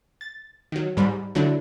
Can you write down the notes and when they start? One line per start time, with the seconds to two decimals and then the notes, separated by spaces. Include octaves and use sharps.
0.21 A6
0.72 D#3 F#3
0.97 G#2 G3 B5
1.35 D3 F#3 A3 D4 E4